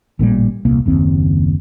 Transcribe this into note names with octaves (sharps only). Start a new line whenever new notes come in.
A1 A#2 C#3 G3
D#1 C2 A#3
F#1 D#2 C4